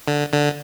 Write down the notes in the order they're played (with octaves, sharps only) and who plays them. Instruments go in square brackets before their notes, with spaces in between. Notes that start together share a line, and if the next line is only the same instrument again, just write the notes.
[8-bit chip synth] D3
D3